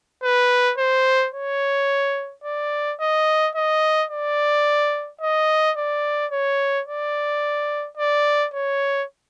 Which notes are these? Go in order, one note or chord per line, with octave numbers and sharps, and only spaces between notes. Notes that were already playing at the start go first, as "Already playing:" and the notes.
B4
C5
C#5
D5
D#5
D#5
D5
D#5
D5
C#5
D5
D5
C#5